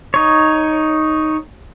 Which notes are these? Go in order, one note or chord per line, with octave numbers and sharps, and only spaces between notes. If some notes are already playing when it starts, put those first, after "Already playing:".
D#4 C#5